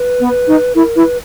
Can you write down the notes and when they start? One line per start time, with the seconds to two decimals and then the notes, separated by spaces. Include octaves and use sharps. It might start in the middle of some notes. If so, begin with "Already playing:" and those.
Already playing: B4
0.20 B3
0.47 D#4
0.75 E4 A#4
0.95 E4 B4